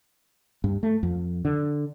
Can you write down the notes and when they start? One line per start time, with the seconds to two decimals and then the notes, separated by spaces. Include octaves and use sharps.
0.64 G2
0.83 A3
1.03 F2
1.45 D3